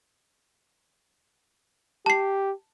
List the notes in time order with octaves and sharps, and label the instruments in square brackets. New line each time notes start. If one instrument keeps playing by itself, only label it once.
[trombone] G4 [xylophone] A5 C7